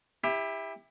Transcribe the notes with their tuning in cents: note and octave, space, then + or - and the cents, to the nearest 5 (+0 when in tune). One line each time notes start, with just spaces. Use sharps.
E4 -10 G4 +30